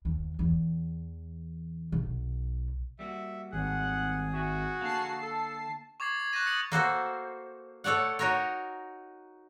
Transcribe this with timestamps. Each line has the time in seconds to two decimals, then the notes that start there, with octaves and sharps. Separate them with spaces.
0.05 D#2
0.39 E2
1.92 B1
2.99 G3 A#3 F#4 E5
3.52 G#1 G#4 F#5
4.34 G#2 F#4 E5 G#5
4.81 D3 A#3 F5 A5 C7
5.23 A4
6.00 C#6 D6 G#6 A6 C7 F#7
6.20 G#6
6.33 C#6 F#6 G6 A6 A#6 D#7
6.46 D#6 A6 C#7 F7 F#7
6.72 A#3 F#4 A4 C5
7.84 A3 A4 C#5 D5 F#5
8.19 D#4 F#4 A#4 C#5